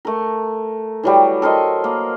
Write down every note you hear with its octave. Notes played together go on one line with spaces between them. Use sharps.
A3 A#4
E3 F#3 G3
A4 A#4 C5 D#5
A#3